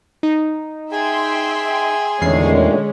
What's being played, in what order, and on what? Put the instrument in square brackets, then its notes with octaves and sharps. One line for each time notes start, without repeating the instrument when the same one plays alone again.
[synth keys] D#4
[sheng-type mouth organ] G#4 G#5 [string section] E5 G5 C6
[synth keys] E2 C7 [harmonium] A#2 D#3 A3 [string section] D3 G#3 C#4